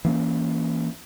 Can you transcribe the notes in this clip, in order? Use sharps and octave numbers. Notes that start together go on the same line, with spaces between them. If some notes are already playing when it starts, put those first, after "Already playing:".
E3 A#3 C#4